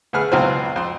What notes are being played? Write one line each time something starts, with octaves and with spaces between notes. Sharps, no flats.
D3 A3 G#4 B4 F6
C#2 B2 E3 F#3 C4 C5
F2 C6